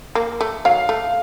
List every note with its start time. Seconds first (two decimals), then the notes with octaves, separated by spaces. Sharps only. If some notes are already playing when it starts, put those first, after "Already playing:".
0.15 A#3
0.41 A3
0.65 F#3 F5
0.89 A3